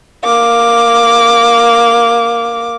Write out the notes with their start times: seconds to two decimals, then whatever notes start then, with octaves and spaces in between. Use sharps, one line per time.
0.24 A#3 D6